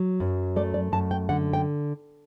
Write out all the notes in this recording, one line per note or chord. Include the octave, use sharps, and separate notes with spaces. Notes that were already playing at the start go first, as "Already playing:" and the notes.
Already playing: F#3
F#2
A3 D5
D5
F#2 A5
G5
D3 F#5
G5